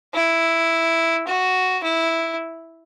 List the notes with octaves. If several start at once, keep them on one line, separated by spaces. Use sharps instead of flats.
E4
F#4
E4